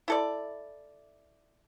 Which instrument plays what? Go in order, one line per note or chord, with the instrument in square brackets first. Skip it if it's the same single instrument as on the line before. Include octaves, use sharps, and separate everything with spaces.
[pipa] E4 A4 D5